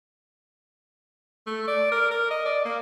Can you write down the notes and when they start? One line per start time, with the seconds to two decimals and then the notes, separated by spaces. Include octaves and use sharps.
1.47 A3
1.68 D5
1.92 A#4
2.11 A#4
2.31 D#5
2.45 D5
2.65 A#3